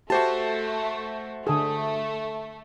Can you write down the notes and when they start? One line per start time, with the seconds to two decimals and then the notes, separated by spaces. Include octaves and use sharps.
0.10 A3 F#4 G4 C5 A5
1.47 D3 A3 G#4